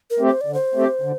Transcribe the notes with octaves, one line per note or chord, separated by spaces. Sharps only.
A#4
A3 C4 G4
C5
D5
D3
C5
A3 C4 G4
D3